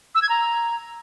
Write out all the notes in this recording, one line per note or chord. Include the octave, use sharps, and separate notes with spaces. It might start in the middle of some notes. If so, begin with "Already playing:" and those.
E6
G#6
A#5